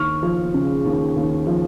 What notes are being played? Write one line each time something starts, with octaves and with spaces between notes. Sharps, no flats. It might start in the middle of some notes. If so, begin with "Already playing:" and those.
Already playing: D#2 C#6 F6
F3
C#3
D#2
D#2
F3